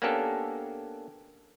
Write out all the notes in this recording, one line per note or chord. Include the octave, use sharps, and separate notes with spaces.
A#3 B3 C#4 D4 G4 A4